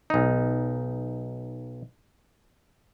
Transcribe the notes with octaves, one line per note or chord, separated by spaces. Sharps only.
B1 D#4